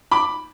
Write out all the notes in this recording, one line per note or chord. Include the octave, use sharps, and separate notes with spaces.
B5 D6